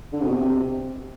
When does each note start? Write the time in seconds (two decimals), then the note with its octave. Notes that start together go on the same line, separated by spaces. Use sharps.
0.13 D3
0.21 C3
0.27 B2
0.35 C3